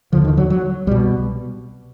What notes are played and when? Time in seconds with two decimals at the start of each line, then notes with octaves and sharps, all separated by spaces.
0.13 D#2 D3 F3
0.25 D#3
0.37 F#3
0.50 F#3
0.87 C2 B2 G3